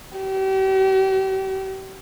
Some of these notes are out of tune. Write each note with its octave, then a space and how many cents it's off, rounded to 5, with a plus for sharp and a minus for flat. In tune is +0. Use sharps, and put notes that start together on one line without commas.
G4 -40